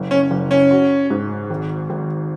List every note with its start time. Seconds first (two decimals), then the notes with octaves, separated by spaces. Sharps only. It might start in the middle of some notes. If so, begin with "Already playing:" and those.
Already playing: F#1
0.11 C#4
0.31 F#1
0.51 C#4
0.71 F#4
1.10 G#2
1.50 G#1
1.90 G#1